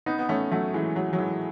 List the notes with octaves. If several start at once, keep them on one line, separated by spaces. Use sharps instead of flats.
B3 D#4
B3
A3 C#4
F#3 A3
E3 G#3
F#3
F#3
E3 G#3